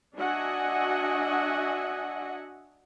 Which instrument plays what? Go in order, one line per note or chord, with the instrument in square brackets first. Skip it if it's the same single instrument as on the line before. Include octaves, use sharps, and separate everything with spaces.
[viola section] D4 F#4 D#5 E5 F#5 G#5